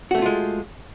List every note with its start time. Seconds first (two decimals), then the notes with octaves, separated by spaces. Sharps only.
0.11 F#4
0.15 A3
0.18 C#4
0.22 F4
0.26 G#3